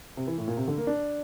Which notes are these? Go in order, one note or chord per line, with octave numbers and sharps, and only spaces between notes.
C3
E3
A2
A#2
C3
D3
A#3
D4